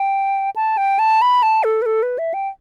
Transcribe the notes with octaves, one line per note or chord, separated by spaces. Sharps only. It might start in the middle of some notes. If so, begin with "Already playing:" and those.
Already playing: G5
A5
G5
A5
B5
A5
A4
B4
A4
B4
E5
G5